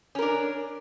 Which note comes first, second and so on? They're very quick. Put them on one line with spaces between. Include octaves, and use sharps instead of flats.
C#4 A#4 D4